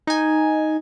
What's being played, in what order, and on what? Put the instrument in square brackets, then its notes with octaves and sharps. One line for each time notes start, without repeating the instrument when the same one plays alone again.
[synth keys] D#4 G#5